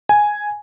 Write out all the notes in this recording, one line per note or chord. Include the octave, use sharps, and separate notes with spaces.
G#5